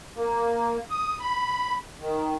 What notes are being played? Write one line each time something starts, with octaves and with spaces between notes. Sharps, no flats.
A#3
D#6
B5
D#3